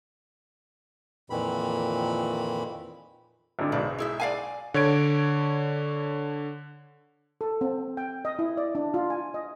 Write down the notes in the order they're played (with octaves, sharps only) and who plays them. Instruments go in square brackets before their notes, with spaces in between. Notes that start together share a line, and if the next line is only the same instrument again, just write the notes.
[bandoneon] F2 A#2 D#3 E3 B5
[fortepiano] G#1 D3
[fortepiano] B1 G#2 [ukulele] D5
[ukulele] E4 G#4 E5
D5 F5 G#5
[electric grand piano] D3 C#5 G#6 D7
[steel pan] A4
C4
G5
D#5
E4
D5
D4
F4
G#5
D#5